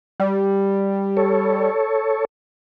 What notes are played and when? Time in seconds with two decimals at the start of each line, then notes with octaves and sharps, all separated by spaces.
0.20 G3
1.17 A4 C#5